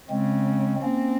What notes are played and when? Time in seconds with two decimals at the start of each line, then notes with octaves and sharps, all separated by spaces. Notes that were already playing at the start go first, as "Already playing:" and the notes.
0.10 C#3 G#3 C4
0.83 A#3 C4 C#4